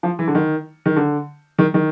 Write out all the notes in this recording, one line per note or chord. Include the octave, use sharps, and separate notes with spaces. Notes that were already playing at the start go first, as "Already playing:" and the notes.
F3
E3
D3
D#3
D#3
D3
D#3
D#3